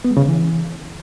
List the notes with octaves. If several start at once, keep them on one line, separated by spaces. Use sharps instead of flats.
B3
G#3
C#3
D3
E3